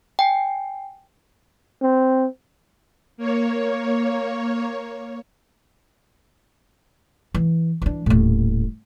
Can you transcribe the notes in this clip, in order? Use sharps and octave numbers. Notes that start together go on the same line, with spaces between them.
G5 G#5
C4
A#3 C#5
E3
E3 D4
D#1 A2